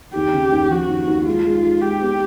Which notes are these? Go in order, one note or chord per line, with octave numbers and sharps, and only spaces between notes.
D#2 G4
C#3
D#2
F3 F#4
D#2
D#2
G#3 F4
G#3
G#3
G#3 G4
B3